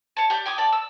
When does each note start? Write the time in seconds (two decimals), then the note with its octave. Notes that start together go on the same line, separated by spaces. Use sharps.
0.17 C#5 A5
0.30 G4 D5 G6
0.46 G5 G#5 D6 D#6
0.58 A4 D5
0.73 E6